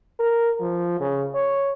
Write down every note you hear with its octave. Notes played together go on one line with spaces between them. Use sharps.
A#4
F3
C#3
C#5